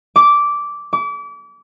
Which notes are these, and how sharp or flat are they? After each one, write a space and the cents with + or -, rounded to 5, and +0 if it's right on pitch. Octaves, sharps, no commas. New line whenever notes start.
D6 -10
D6 -35